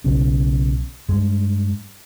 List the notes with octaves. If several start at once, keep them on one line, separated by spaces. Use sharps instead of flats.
B1 C#3
G2 G#3